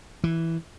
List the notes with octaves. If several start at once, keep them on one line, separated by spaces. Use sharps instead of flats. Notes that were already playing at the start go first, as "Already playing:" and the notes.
E3